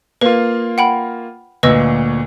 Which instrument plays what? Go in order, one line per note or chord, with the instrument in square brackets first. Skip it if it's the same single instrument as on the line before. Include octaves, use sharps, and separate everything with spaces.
[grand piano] A#3 F4 [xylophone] B4
[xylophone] F#5 G5 B5
[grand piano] D2 A#2 [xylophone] B4 D#5 E6